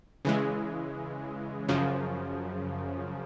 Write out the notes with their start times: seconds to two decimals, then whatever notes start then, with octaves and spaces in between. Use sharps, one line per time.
0.25 C#3 E3 G#3
1.69 F#2 C#3 F3